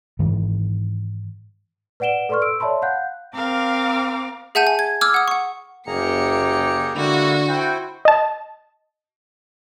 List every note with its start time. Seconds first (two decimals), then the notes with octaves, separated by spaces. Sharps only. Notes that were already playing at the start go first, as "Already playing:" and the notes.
0.19 G#2 D#3 E3
2.00 B4 D5 F#5 D7 E7 G7
2.29 A4 B4 D5 C6 C#6 F6
2.42 A4 E6 D7
2.60 C#5 D5 E5 A5 B5 C6
2.82 F5 F#5 F#6 G6
3.35 C4 A#4 F5 D6
4.55 G#4 E5 F#5 A5 G6 D#7
4.67 G#5
4.79 G#6
5.01 D6 E6 F6 G#6
5.14 F#5 D#6
5.28 F#5 C#6
5.87 F#1 A#3 G4 G#4 A#5 C#7
6.94 D3 G#3 A#3 E4 F#4
7.48 E4 C5 G5
8.05 D#5 A5